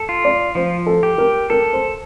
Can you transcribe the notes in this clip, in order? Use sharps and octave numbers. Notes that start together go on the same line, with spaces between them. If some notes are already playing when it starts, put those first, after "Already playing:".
Already playing: A4
F4
D5
F3 C5
A4
G4
A#4
A4 A#4
C5